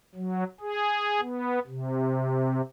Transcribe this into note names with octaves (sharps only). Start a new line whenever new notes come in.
F#3
G#4
B3
C3